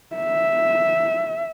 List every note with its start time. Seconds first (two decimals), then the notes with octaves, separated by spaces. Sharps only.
0.16 E5